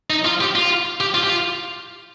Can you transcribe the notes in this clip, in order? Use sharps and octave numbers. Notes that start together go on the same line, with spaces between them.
D#4
F4
G4
F4
G4
F4
G4
F4